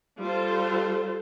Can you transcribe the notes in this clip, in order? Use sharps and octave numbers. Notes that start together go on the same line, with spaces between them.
G3 F4 A4 C5